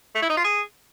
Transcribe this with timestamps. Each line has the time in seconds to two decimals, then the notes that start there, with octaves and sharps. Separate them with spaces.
0.15 A3
0.22 E4
0.30 D#4
0.37 F4
0.44 G#4